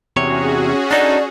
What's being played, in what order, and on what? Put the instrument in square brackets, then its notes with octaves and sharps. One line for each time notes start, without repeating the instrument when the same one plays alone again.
[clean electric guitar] E2 C3 C#5 [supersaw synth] C#4 F#4 G#4
[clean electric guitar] D4 D#4 A4 [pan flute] D5